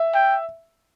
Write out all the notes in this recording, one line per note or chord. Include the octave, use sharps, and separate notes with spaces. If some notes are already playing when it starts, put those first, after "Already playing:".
Already playing: E5
G5